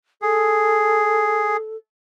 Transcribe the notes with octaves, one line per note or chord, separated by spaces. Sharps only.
G#4 A4